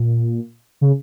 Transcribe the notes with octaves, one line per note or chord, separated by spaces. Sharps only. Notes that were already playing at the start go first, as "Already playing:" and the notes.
Already playing: A#2
C#3